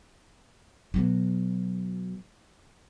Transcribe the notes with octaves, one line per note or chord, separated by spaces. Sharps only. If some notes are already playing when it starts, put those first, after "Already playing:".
B2 F#3